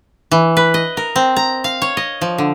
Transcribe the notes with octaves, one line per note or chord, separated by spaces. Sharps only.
E3
B4
D#5
A#4
C4
A#5
F5
C#5
D#5
F3
D3